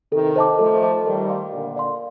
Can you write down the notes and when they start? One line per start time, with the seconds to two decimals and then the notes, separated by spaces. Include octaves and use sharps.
0.12 C3 D#3 A4
0.36 C5 D#5 A5 D6
0.59 F3 A3 A4
0.82 C5 D#5 A5 D6
1.06 D#3 G3 A#4
1.29 D5 F5 C6
1.53 A#2 D3 A#4
1.76 D5 F5 C6